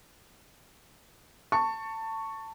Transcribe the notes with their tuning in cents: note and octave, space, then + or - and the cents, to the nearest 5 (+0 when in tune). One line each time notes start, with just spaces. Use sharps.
A5 +20 C#6 +0